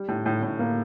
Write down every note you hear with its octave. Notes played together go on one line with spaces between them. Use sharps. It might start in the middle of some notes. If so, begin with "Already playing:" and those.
Already playing: G3
A2
A2
A2
A#3